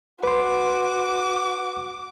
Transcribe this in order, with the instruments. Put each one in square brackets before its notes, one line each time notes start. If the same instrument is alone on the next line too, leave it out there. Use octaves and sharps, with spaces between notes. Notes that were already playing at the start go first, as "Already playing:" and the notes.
[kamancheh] F#4 [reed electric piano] B4 C6 [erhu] D6